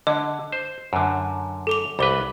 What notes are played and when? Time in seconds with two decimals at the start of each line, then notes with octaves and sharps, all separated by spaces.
0.07 D3 D#5
0.52 C5
0.93 F#2 D3
1.67 A4 D6 F7
1.99 C2 B4 B5 D6